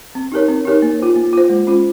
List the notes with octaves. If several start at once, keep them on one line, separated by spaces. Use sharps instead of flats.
C4
D#4 G4 A#4 C#5
C4
D#4 G4 A#4 C#5
A#3
F4 C5
A#3
F4 C5
G#3
C#4 F4 C5